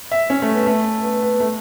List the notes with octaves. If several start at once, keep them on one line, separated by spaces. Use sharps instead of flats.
E5
C#4
A3
B3
A3
B3
B3
A3